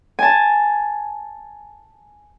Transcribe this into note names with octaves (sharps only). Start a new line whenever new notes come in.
G#5 A5